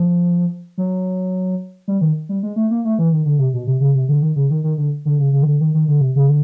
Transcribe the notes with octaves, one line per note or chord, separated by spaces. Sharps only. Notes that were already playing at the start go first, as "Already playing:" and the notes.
Already playing: F3
F#3
G3
D#3
G3
G#3
A3
A#3
A3
E3
D#3
D3
C3
B2
C3
C#3
C3
D3
D#3
C#3
D#3
D#3
D3
D3
C#3
C#3
D#3
D3
D#3
D#3
D3
C3
C#3
D3